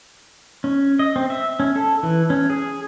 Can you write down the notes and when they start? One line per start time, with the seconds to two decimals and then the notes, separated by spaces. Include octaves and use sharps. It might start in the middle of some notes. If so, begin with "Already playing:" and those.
0.64 C#4
0.99 D#5
1.16 C4
1.30 E5
1.60 C#4
1.76 A4
2.03 E3
2.30 C#4
2.50 G#4